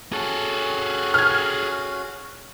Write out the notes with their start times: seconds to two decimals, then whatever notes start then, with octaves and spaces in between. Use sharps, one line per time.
0.12 C#4 F#4 G#4 A4
1.14 F6 G#6